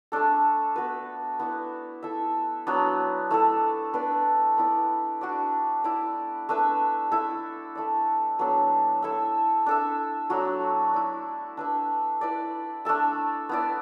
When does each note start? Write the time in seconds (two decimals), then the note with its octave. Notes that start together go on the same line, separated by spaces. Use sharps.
0.12 A3 D4 A4
0.76 B3 F#4 B4
1.39 B3 E4 D5
2.03 E4 A4 E5
2.67 F#3 B3 D4
3.31 A3 E4 A4
3.93 B3 D4 B4 D5
4.58 B3 E4 D5
5.21 D4 F#4 D5
5.84 E4 D5
6.49 A3 D4 B4 E5
7.12 E4 A4 E5
7.75 A3 E4 D5
8.39 F#3 B3 D4 A4
9.02 E4 A4 E5
9.66 D4 A4 E5
10.30 F#3 A3 D4 F#4
10.94 E4 D5
11.57 D4 B4 E5
12.21 E4 B4 D5
12.85 A3 D4 A4 E5
13.49 B3 E4 D5